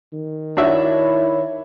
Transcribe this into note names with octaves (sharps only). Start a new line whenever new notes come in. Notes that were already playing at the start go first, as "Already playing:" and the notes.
D#3
D4 E4 F#4 C#5 E5